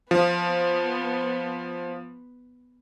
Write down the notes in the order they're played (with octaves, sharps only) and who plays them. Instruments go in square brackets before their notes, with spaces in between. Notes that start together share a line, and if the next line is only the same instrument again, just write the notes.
[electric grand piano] F3 [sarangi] B3